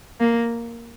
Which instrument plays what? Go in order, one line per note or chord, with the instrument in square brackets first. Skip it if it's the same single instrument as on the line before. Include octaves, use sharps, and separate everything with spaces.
[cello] A#3